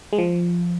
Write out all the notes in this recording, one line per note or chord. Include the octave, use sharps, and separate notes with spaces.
G#3
F3